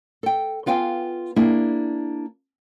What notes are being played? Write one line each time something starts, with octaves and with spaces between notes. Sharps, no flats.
A4 G5
B3 F4 F5 G5 G#5
A#3 D4 E4 G#4